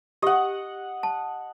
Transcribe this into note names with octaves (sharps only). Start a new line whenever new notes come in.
G4 D#5 F#5
A5